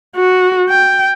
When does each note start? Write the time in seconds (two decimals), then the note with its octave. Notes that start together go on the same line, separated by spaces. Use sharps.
0.16 F#4
0.69 G5